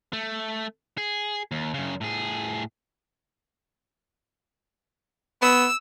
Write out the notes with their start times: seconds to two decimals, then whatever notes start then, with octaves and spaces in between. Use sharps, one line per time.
0.13 A3
0.98 G#4
1.52 D#2
1.74 F#2 C#3
2.01 A2 G#4
5.42 B3 E6